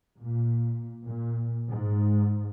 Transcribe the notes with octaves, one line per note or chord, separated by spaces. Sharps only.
A#2
A#2
G#2